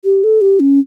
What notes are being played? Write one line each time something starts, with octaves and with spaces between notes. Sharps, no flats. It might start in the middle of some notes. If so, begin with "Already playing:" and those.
G4
A4
G4
C#4